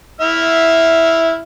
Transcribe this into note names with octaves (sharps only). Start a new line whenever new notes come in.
E4 E5 F6